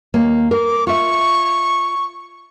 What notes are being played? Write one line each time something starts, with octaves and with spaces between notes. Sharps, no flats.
D#2 A#3 C#5
A#4 D6
F4 E5 C#6